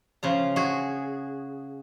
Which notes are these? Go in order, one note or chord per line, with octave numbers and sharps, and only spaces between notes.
C#3 F3 A#5
F#4 G#4